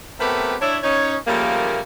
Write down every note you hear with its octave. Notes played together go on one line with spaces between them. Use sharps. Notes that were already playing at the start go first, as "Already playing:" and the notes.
A3 B3 C4 G4 A#4 B4
D4 E4 C#5
C#4 D#4 C#5
C#3 F3 G3 A3 A#3